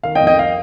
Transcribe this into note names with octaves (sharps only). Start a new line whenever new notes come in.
D#3 F5
D#5 G5
F2
D#5 G5
F5